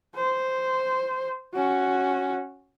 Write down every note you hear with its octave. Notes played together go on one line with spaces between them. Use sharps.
C5
C#4 F#4